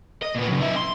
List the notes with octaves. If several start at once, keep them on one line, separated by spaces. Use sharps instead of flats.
D#5
A#2 B3
C#3 F#3
D#4 E5
C6